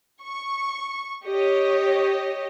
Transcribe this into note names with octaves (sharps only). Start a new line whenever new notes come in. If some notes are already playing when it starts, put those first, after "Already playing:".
C#6
G4 C#5 D#5